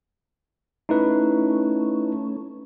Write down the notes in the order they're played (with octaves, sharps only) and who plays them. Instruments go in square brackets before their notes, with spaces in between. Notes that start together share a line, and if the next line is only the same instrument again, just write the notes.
[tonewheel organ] A3 C#4 [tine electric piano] D#4 E4 B4